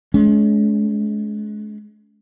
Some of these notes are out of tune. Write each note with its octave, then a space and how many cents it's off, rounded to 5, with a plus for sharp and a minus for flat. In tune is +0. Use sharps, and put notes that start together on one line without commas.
G#3 +35 C#4 +40